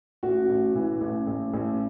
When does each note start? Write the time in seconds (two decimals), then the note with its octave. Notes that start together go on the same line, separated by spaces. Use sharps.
0.23 A1 F#4
0.49 A1
0.75 E3
1.01 A1
1.27 A1
1.53 A1